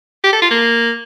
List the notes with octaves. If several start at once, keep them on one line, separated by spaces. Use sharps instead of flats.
G4
A4
F4
A#3